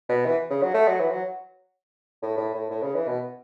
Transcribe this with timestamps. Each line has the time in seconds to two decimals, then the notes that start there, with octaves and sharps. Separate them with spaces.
0.09 B2
0.26 E3
0.50 C#3
0.62 F#3
0.74 A3
0.88 F#3
1.00 E3
1.11 F#3
2.22 A2
2.37 A2
2.54 A2
2.70 A2
2.82 C#3
2.95 E3
3.07 B2